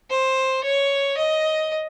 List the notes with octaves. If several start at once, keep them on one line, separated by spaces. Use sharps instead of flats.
C5
C#5
D#5